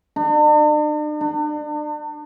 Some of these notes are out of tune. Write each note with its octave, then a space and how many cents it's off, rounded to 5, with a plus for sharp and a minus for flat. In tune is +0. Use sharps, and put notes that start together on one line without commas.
D4 +45
D4 +35